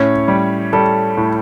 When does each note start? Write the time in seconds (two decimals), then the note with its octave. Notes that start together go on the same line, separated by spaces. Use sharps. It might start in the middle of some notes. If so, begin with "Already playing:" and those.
Already playing: A2 C#4 C#5
0.28 G3
0.73 G3 A4
1.17 A2